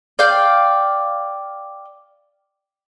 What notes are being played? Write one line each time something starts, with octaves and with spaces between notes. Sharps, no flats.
D5 F5 G5